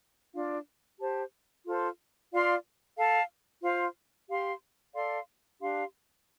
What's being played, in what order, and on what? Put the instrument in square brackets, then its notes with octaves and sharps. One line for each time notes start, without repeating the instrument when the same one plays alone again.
[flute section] D4 F4 D5 F5
G4 C5 A5
F4 A4 C5
F4 D5 F5 C6
A4 F5 A5
F4 C5 F5
G4 F5 C6
A4 D5 F5 C6
D4 G4 F5 C6